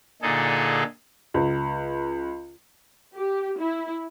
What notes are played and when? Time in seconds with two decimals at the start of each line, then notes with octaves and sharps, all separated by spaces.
0.22 A#2 D3 D#4 G#4 A4
1.34 C#2
3.15 G4
3.59 E4